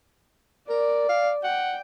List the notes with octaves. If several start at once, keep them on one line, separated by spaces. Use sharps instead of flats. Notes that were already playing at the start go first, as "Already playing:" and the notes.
A#4 D5
F5
F#5 G5